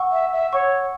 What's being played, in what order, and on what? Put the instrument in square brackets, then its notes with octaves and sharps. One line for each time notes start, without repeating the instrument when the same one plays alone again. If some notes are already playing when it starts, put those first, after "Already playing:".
Already playing: [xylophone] F#5 C#6 E6
[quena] E5
E5
[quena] C#5 [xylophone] F#5 C#6 E6